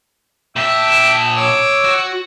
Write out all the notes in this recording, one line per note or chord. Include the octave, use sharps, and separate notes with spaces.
A#2 E5 G5 A5 D6
C#5 D6 E6
F#4